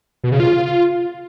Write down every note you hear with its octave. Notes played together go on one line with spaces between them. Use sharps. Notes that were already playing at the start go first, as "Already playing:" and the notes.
B2
C#3
F4